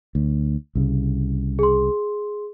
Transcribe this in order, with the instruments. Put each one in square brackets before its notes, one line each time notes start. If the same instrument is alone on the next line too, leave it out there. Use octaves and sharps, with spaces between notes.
[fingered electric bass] D2
C2 C#3
[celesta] G#4 C6